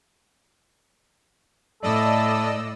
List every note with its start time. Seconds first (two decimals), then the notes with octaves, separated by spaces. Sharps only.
1.83 A2 A4 D5 D#5 E6